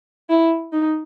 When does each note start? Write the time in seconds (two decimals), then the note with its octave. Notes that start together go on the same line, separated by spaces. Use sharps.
0.30 E4
0.73 D#4